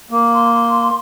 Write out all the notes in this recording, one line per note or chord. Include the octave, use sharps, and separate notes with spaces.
A#3
C6